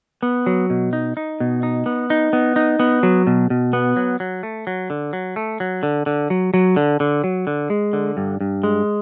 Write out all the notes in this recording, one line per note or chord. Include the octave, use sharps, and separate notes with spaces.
B3
F#3
B2
D#4
D#4
B2
D#4
B3
D#4
B3
D#4
B3
F#3
B2
B2
B3
F#3
F#3
A3
F#3
D3
F#3
A3
F#3
D3
D3
F#3
F#3
D3
D3
F#3
D3
G#3
D3
G2
G2
G#3